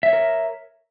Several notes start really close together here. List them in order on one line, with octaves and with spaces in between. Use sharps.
E5 C#5 A#4